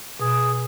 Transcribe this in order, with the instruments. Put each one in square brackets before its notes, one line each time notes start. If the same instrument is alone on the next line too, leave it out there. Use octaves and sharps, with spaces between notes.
[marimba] B2 [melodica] G#4